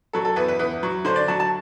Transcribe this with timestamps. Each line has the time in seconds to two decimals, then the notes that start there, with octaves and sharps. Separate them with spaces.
0.13 F#3 A4
0.25 A4
0.36 E2 B4
0.48 B4
0.59 E2 B4
0.83 F#3
1.05 D3 C5
1.16 D5
1.28 F#3 A5
1.40 A5